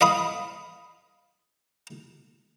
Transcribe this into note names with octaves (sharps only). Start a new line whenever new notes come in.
D#5 F5 B5 D#6